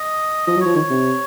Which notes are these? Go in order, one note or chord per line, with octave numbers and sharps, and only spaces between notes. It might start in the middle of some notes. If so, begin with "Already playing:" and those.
Already playing: D#5
F3 D#5
F#3
F3 C#5
D#3 C#5
C3